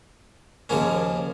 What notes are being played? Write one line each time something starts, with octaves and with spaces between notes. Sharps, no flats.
D#2 C#3 F3 A#3 C#4